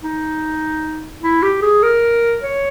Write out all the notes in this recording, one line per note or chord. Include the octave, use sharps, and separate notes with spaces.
D#4
E4
G4
G#4
A#4
C#5